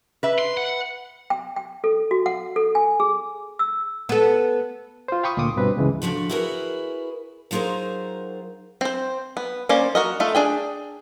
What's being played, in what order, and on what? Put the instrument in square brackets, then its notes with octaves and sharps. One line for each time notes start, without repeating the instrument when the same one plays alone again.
[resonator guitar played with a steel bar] B4 E5
[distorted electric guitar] C6
F#5
[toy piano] G5
G5
A4
F#4
F#5
A4
G#5
G#4
E6
[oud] B3 A4
[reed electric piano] F4 C5
F5 G5 B5 C#6 D#6
D2 A#2 C6 D6 D#6
G2 B2 C4 B4
C#2 C#3 E3 G#3
[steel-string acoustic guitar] A2 D3 F3 F#4
E4 F#4 G#4 A#4 B4
F#3 D#4 F4 G#4 A#4 C5
[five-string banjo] C4 C5
B3
A#3 C#4 C5 D5
F#4 A#4 D#5
A3 F4 A4
D4 G#4 G5